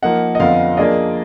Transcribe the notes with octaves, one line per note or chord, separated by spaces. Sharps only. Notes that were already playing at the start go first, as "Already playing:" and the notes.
F3 A#3 D#4 F#5
D#5
F2 D3 F3 B3 F5
F3 A#3 D4 G#4 D5 D#5